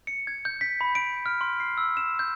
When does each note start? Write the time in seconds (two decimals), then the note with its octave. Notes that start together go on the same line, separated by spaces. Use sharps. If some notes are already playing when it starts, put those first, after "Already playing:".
0.07 C#7
0.27 G#6
0.45 G6
0.61 B6
0.81 B5
0.95 D7
1.26 F6
1.41 C6
1.60 C7
1.78 E6
1.97 E7
2.19 G6